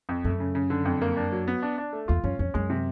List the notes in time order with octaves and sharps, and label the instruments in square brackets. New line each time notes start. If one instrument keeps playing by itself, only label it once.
[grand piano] F2
[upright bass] F#2 [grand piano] A3
[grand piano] C#3
C#3
D3
F2
A#3
D4
F#3
B3
D4
D4
A3
[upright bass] E2 [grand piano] F4
[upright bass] F#2 [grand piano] C#4
[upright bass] F2 [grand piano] C#4
[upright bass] F#2 [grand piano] G#3
[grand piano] C3